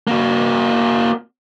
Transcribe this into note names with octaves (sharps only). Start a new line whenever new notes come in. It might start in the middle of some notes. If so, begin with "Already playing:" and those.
A#3 F#4